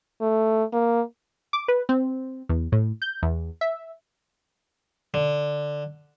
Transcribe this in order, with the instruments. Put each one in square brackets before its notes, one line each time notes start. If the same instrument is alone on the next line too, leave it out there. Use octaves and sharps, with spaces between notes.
[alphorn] A3
A#3
[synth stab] D6
B4
C4
E2
A2
G6
E2
E5
[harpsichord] D3